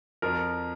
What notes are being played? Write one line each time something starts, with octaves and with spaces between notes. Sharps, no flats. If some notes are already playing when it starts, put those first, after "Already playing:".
F2 F3 A#4